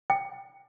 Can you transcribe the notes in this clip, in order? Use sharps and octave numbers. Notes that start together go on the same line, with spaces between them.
G5